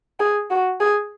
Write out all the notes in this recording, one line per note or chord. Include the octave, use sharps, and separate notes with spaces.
G#4
F#4
G#4